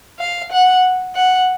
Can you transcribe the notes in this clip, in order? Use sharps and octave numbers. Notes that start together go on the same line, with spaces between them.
F5
F#5
F#5